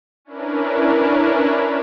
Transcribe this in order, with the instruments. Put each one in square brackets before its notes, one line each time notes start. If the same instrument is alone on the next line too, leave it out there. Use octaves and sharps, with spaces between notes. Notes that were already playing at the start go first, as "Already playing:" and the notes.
[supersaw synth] C#4 D4 E4 A#4 B4